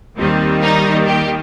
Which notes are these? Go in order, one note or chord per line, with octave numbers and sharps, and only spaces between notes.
D#2 D#3 G3 A#3 C4
D#4
G4